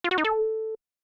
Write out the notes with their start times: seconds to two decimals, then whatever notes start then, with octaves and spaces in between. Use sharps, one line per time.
0.04 F4
0.11 F#4
0.18 D#4
0.24 A4